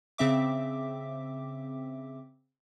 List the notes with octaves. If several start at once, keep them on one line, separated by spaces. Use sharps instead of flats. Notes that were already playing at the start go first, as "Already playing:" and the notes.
C#3 C4 E5 D6